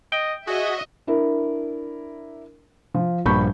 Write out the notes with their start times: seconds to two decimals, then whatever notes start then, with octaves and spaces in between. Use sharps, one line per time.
0.12 D#5 G5
0.47 F#4 G#4 D#5 E5
1.07 D4 E4 A#4
2.94 F3
3.26 A#1 G2 B5 C#6 G6